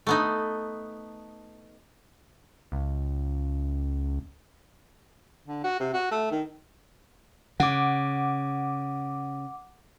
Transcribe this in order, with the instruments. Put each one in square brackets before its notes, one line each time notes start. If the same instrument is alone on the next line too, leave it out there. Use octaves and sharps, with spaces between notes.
[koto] A3 B3 D#4
[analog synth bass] C#2
[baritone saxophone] D3
F#4
C3
F#4
A3
D#3
[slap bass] C#3 [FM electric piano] F#5 D6